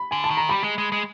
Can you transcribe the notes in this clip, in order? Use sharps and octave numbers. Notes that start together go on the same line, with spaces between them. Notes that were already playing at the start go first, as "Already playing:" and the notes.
Already playing: B5
D3 G#5
A5
D#3
A#5
G3 B5
G#3
G#3
G#3